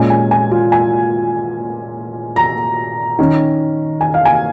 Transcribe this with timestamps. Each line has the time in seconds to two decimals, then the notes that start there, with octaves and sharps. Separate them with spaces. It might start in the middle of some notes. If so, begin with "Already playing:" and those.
Already playing: A#2 G#3 C#4 G#5
0.10 G#5
0.31 G#5
0.51 F4
0.72 G#5
2.36 A#5
3.19 D#3 C#4
4.01 G#5
4.14 F5
4.25 G#5